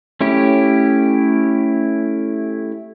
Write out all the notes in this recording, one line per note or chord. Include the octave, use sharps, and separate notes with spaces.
A3 C#4 E4 G4